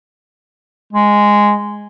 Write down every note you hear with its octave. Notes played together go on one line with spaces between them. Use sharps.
G#3